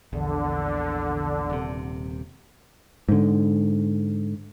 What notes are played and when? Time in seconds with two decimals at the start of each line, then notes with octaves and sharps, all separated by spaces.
0.13 A#1 E2 D3
1.50 D#1 C3
3.09 G#2 D3